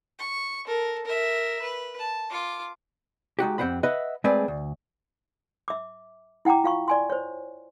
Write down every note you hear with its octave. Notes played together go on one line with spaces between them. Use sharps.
C#6
A4 A#4
A#4 E5
B4
A5
F4 D6
G#3 D#4 F#4 G4
F2 C4 G4 C5 F#5 B5
B4 D#5 E5 F#5 B5
G#3 A3 C4 G#4 B4 D5
D2
E5 D6
E4 F#5 G5 A#5 D6
F4 F5 C#6
D5 G#5 C6
C5 C#5